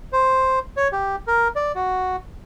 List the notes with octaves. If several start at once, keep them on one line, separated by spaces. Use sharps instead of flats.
C5
C#5
G4
A#4
D5
F#4